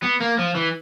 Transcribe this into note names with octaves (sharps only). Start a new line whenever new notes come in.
B3
A#3
F3
E3